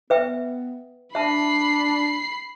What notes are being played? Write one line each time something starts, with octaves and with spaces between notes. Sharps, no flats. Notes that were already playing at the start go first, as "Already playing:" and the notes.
B3 B4 E5 G5
D4 E5 A5 B5 C7